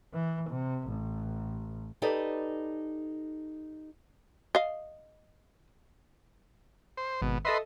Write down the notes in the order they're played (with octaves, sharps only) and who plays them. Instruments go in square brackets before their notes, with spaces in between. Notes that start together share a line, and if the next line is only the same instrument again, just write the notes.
[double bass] E3
C3
A1
[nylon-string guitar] D#4 G4 A4 B4 D5 D#5
[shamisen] D#5 F5
[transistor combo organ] C5
[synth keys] G#1 [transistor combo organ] B2
[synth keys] A4 D#5 E5 [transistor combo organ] B4 C6